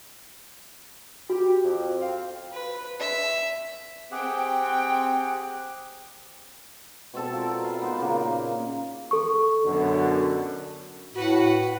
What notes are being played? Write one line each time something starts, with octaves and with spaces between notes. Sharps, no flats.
F#4 G4
F2
C4 F5
B4
E5
C4 G4 G#4 F#5 G5
B2 C4 A4 A5
F4 A#4 D5
F5 F#5 B5
B3 D#4 C5
A#2 C#3 A#3
A4 C#6
F#2 B2 D3
A2 F#4 B4 F#5